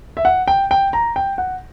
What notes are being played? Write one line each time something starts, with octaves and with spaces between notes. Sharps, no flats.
E5
F#5
G5
G5
A#5
G5
F#5